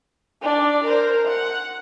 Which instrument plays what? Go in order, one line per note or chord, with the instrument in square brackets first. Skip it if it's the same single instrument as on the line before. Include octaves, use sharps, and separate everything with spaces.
[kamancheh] D4 D5
A#4 C5
F#5